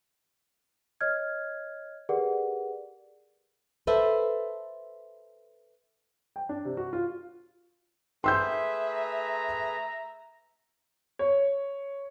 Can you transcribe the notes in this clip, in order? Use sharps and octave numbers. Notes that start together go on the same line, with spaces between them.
C#5 D#5 F6 G#6
G4 G#4 A#4 B4 D5 F#5
A4 B4 C5 E5
G5
D4
C3
F#4
F4
A3 G#4 B4 E5 C6 E6 G6
A#5
C#5